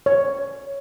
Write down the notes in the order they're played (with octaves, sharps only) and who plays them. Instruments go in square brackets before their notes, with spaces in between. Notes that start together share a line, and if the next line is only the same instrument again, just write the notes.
[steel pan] C#5